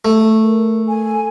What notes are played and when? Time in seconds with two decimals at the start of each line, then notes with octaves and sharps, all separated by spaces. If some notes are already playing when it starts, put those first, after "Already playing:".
0.05 A3
0.43 A#4
0.86 A4 G#5